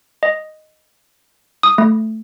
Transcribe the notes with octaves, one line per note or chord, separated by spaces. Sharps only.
D#5
D#6
A3